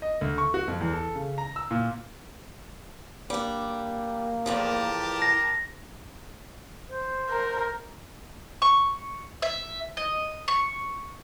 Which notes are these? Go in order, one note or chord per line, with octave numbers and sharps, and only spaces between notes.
D#5
D2
C#6
F#4
F2
E2
A4
C#3
A#5
E6
A#2
G3 A#3 D4
E2 A2 F3 G4 A#4 A5
A#6
C5
A#4
C#6
E5
D#5
C#6